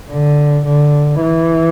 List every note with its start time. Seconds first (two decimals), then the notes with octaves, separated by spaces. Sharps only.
0.11 D3
0.66 D3
1.21 E3